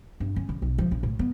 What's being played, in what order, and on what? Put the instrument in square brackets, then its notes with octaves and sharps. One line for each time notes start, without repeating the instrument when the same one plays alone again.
[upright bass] G2
C#4
F#2
B1
F3
A#1
A2
B3